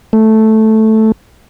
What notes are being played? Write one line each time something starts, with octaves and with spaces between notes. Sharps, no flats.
A3